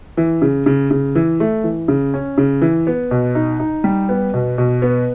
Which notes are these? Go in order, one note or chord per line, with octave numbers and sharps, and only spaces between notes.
E3
C#3
C#3
C#3
E3
A3
E3
C#3
C#4
C#3
E3
B3
B2
D#4
D#4
G3
B3
B2
B2
B3